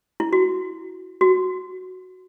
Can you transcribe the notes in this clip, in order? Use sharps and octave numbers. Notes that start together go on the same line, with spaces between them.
E4
F#4
F#4